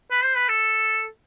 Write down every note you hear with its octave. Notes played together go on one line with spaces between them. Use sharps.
B4
C5
B4
A4